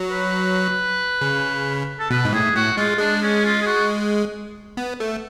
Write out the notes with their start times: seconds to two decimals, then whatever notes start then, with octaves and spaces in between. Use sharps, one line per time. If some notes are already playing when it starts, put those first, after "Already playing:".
Already playing: F#3
0.11 B4
1.21 C#3
1.99 A4
2.10 B2 B4
2.25 G#2
2.33 A2 G#4
2.55 A2 F#4
2.77 G#3 F4
2.99 G#3 D4
3.22 C#4
3.44 F4
3.61 G#4
3.66 F#4
4.77 B3
5.00 A3